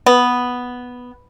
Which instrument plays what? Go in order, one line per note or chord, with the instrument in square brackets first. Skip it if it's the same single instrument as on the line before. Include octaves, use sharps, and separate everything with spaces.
[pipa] B3